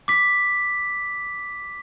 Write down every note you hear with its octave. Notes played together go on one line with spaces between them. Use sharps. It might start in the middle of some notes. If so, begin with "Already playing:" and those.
D6 B6